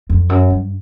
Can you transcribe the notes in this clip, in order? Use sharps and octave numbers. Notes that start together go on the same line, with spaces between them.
F2
F#2
G2